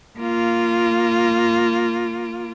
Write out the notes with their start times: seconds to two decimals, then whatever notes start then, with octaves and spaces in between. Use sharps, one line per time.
0.19 A#3 F4